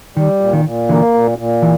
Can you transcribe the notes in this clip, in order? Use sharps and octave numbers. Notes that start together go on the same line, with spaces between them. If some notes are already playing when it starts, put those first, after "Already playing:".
D#3 G3
A#2
D#3
A#2
D3 E3 A#3
A#2
A#2
E3